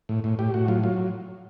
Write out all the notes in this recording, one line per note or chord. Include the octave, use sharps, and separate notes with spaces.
A2
A2
A2 G4
A2 F#4
F#3 F4
F#3 F4